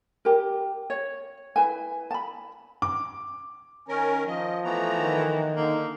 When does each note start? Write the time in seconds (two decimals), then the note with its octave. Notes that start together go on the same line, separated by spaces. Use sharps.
0.25 G4 A#4
0.90 C#5
1.56 E4 B4 G#5
2.11 A5 B5
2.82 D6
3.88 D#3 C#4 A#4 G#5
4.27 F3 D#5
4.64 E3 A3 B3 A#5
4.99 D#3
5.56 D3 A#3 D#4